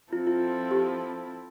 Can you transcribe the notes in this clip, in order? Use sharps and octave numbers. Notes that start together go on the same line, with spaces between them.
F3 C4 E4 F4 A4
F4
G4